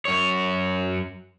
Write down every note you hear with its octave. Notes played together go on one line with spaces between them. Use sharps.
F#2 C#5